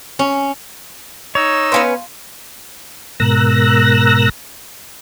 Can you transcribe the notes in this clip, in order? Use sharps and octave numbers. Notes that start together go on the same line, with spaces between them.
C#4
D#4 C#5 E6
B3 C#4 B4 F5 C6
G#2 B2 A#4 E6 F#6 A#6